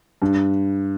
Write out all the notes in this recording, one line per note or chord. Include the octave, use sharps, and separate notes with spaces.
G2